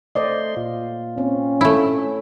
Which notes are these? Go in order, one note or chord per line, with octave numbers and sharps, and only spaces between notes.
A3 C5 D5 D#5 C6
A#2 F4
C4 C#4
A3 E4